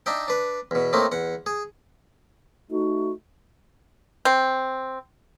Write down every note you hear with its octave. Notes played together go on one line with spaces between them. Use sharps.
D4 D#4 E5 G5
D4 B4
E2 B2
A2 A3 A#3 C4 D#4
E2 F#5
G#4
A3 D#4 F#4
C4